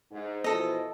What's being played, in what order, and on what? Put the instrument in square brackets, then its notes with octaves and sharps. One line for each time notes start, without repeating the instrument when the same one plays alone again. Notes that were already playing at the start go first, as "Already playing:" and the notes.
[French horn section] G#2
[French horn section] B2 E3 F3 [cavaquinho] A4 D#5